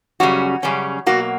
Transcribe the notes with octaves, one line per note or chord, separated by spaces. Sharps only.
F#2 C#3 G3 C#4 F#4
F#2 C#3 G3 C#4
B2 F#3 A#3 F#4